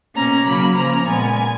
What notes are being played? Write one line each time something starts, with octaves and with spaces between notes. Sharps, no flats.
B2 A#3 C#4 A#5
C#3 F#3 A#3 B5
C#3 F3 A#3 A#5
A#2 G#3 B3 G#5